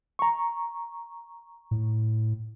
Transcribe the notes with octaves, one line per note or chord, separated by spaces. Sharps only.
A#5 C#6
A2